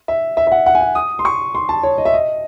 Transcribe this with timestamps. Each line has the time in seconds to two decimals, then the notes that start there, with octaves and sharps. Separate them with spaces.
0.08 E5
0.37 E5
0.47 E5
0.52 F#5
0.66 F#5
0.75 G#5
0.81 F#5
0.95 D#6
1.19 C6
1.25 C#6
1.55 C6
1.69 A5
1.83 C#5
1.98 D#5
2.05 E5
2.14 D#5